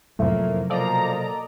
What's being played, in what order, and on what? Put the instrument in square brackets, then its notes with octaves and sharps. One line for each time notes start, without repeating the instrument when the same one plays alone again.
[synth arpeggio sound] F2 A2 [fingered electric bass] C3 F#3 [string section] F3 A#3 [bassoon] A3
[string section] B2 A#3 A#5 [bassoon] F3 [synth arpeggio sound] A4 D5 D#5